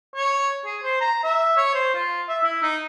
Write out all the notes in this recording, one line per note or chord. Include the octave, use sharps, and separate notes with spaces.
C#5
G#4
C5
A#5
E5
C#5
C5
F4
E5
E4
D#4